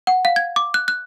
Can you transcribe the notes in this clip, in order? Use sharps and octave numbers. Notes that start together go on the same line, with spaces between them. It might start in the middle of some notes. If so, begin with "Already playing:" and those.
F#5
F5
G#6
D6
F#6
F#6